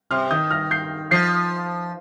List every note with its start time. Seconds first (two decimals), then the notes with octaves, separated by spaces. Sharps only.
0.11 C3 C6 F6
0.31 D#3 D#6 G6
0.51 F6 A#6
0.71 G6 C7
1.11 F3 G6 C7